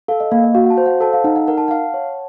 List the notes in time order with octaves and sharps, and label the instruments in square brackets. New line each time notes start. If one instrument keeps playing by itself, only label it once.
[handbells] A4 [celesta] F5
[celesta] D#5
[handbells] A#3 [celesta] F5
[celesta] D#5
[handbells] F#4 [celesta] F5
[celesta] F#5
A5
[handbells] C5
[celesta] F#5
[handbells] A4 [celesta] A5
[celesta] F5
[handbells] D#4 [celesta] F#5
[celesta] F#5
[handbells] A#4 [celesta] F#5
[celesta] A5
[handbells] F5 [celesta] F#5
[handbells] C#5